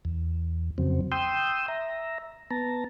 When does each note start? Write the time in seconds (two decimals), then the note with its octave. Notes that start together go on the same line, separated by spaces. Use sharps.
0.05 E2
0.78 F2 C#3 F#3 C4
1.12 G5 C6 D#6 E6 G6
1.68 E5 A#5
2.51 B3 A5 A#5